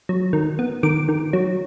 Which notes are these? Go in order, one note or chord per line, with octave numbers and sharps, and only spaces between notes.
F#3
D#3
B3
D#3 D6
D#3
F#3